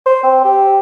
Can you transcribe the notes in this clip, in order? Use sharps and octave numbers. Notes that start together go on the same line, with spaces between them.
C5
C4
G4